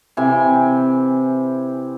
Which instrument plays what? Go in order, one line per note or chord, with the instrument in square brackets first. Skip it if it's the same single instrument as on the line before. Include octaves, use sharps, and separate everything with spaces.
[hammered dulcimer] C3 E3 G5 G#5